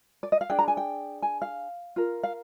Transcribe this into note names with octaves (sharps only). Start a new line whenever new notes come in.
D5
D#5
F5
D4 G#4 G5
A#5
G#5
G5
G#5
F5
F4 A#4
F5